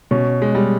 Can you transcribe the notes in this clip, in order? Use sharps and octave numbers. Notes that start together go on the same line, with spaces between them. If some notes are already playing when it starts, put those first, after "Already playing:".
B2 C#4
G#3
G3